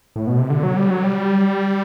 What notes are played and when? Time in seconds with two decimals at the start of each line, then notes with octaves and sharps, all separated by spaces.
0.16 A2
0.27 B2
0.39 C3
0.50 D3
0.63 F#3
0.77 G3
0.91 F#3
1.04 G3